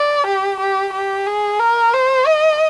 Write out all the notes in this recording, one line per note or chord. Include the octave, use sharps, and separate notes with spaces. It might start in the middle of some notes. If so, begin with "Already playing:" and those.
Already playing: D5
G4
G4
G4
G#4
A#4
C5
D#5